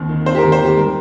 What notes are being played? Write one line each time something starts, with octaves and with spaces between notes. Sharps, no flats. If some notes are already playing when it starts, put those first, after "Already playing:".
Already playing: D#2 C4
D#3
C4 C5
G4
D#2 A#4
C5
D#3 G4
G3 A#4